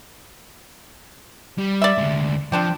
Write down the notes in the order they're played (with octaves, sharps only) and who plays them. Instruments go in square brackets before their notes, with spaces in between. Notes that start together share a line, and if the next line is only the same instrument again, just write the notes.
[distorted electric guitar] G3
[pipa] D5 E5
[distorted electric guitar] D2 G#3
[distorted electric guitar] F3 [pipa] C4 D4 G4